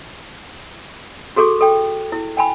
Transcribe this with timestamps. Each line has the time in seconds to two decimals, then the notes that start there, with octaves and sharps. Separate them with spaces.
1.36 F#4 G#4 A4 C#6 D6
1.61 A4 G5
2.12 E4
2.37 G5 G#5 B5